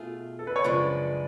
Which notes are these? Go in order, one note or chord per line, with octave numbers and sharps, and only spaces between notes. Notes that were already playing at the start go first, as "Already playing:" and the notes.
Already playing: B2 A3 F4 G#4
A4
B4
C#5
F#2 C#3 F3 G#3 D4 B4 D5